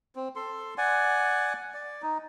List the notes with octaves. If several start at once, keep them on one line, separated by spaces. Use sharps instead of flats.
C4
A4 C6
D5 F#5 G#5
D5
D#4